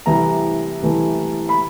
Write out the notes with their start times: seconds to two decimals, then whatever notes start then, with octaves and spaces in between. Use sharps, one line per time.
0.06 C2 C3 E3 A3 A#5
0.82 C2 C3 E3 A3
1.49 B5